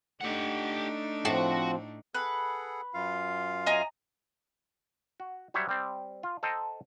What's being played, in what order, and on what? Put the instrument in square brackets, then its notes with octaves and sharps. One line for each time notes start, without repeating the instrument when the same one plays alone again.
[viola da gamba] A3 D4 D#4 [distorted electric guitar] G4 F#5
[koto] A2 A5 [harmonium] F3 C4 [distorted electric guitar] F#4
[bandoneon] G#4 A4 F#5 [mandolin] B4
[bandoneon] F#2 F4 F5
[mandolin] D#5 G#5 A#5
[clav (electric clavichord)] F#4
F#3 G3 C5 C#5 E5
G3 C4
F4
A4 C5 D#5 G5 A5 A#5